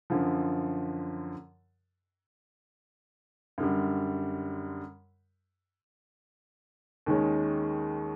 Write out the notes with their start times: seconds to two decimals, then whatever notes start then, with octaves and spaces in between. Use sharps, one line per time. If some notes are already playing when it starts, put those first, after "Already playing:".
0.10 F#2 D3 F3
3.58 F#2 D3 G3
7.06 D#2 D#3 G#3 C#4